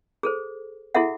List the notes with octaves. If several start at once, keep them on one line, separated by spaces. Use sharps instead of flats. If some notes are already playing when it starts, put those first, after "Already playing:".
G#4 A4 C5
E4 F#4 G#4 A4 E5 F#5